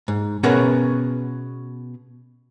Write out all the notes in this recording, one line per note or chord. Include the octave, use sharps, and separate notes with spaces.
G#2
B2 C#4 G#4 A#4 B4 F#5